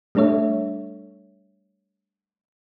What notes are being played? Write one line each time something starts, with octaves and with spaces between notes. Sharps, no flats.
G3 A3 D4 A4 C#5 E5